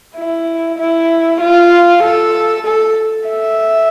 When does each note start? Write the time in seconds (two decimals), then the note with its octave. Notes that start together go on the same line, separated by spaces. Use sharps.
0.15 E4
0.78 E4
1.40 F4
2.02 A4
2.66 A4
3.28 E5